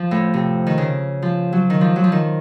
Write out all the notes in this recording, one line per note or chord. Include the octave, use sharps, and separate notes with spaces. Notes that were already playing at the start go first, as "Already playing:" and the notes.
Already playing: F3
A2
C3
D#3
C#3
F3
F#3
D#3
F3
F#3
F3
D#3